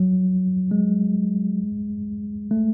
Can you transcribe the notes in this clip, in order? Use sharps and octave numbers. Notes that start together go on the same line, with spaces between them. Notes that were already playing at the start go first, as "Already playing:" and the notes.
Already playing: F#3
G#3
A3